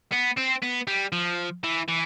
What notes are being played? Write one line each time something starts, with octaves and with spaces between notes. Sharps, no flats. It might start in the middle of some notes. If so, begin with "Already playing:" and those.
B3
C4
B3
G3
F3
E3
E3